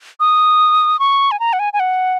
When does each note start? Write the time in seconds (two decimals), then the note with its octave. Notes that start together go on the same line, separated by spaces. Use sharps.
0.20 D#6
0.99 C#6
1.31 G#5
1.40 A#5
1.53 F#5
1.59 G#5
1.73 G#5
1.80 F#5